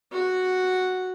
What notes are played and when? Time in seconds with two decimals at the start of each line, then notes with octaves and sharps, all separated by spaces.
0.12 F#4 F#5